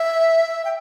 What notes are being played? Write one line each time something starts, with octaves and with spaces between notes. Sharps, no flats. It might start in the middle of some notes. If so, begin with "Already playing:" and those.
Already playing: E5
G5